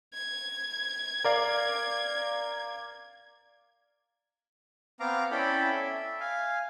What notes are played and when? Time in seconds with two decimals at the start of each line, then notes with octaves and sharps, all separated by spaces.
0.14 G#6
1.24 A#4 D5 F5
5.00 B3 C4 F5 A#5 D6
5.31 C#4 E4 A4 D5 G5 B5
5.74 E5
6.20 F5 G#5